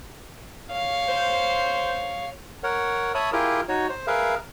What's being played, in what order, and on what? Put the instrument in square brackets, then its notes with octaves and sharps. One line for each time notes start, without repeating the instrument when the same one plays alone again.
[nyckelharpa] C#5 F5
[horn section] C5
[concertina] A#4 C#5 F#5
C#5 E5 A5 B5 D#6
E4 F4 G4 G#4 A#4
D#4 F#4 C#5
C5
G#4 A#4 B4 E5 F5